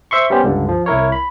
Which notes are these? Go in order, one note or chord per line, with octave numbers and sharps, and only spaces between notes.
C5 E5 C6 C#6
G3 B3 C#4 G4 C5
C#2 G2 D3
F3
C2 E4 A#4 C#5
B5